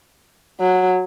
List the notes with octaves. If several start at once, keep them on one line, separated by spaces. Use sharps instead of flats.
F#3